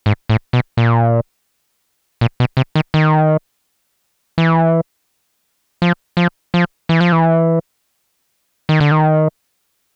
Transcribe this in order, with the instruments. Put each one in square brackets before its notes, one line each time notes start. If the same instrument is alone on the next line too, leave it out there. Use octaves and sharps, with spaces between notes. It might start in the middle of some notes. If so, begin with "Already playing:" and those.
[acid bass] G#2
A2
B2
A#2
A#2
B2
C3
D#3
D#3
E3
F3
F3
F3
E3
F3
E3
D#3
D3
D#3